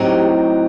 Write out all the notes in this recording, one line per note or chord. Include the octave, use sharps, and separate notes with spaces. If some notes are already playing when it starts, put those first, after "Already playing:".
Already playing: A2 F#3 C4 D#4 G4